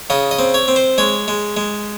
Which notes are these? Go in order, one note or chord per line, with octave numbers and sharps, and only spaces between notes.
C#3 D#5
D#5
C4
C#5
C4
C5
G#3 C#5
G#3
G#3